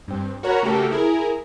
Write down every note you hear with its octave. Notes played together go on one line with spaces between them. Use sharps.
G2 C4
F#4 A#4 C#5 F#5 A#5 B5
C#3 A3 A#3 F#4 G4 A4
E4 G#4 A#4